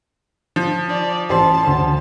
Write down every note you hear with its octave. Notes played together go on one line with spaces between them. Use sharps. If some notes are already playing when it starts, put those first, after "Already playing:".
F3
D5
A1 C5 A5 C6
D2 C6